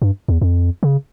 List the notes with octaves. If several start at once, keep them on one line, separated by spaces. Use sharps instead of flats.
G2
E2
F2
C#3